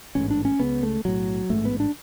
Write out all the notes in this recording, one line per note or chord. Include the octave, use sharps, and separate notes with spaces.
A1 G#2 C#4
D4
C#4
C#2 C#3 B3
A3
B1 A2 F#3
A1 G#2 A3
B3
D4